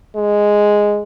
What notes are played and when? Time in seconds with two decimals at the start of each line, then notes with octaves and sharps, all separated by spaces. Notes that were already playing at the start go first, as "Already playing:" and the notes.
0.16 G#3